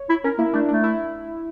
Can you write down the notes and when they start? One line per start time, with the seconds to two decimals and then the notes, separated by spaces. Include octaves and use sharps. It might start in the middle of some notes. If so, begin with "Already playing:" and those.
Already playing: C#5
0.09 E4
0.24 C#4 A#4
0.39 A#3 E4
0.53 A3 D4
0.69 A3 D4
0.84 E4